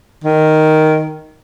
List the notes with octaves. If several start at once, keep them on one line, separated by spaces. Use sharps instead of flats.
D#3